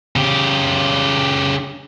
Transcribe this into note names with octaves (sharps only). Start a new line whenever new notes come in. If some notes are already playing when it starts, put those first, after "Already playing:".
C#3 G4